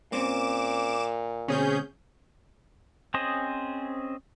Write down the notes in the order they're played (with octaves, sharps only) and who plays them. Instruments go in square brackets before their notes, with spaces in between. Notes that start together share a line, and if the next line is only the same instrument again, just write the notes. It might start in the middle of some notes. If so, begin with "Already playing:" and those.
[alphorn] A#2 [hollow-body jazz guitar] A#3 C4 C#4 [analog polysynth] D6 E7
[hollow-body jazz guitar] D2 B2 C4 [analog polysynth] C#4 G#4 G6
[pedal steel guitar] C4 C#4 G#4 C5 D#5